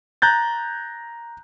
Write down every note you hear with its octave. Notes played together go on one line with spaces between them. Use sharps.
A#5 F#6 G6 A6